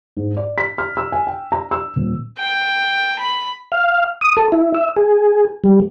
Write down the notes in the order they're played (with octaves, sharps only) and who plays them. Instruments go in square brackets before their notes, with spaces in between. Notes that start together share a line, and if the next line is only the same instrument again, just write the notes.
[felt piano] G#2
D5
B6
F6
E6
G#5
G5
A#5
E6
D#1
[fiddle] G5
B5
[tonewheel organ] F5
D#6
A4
E4
E5
G#4
G3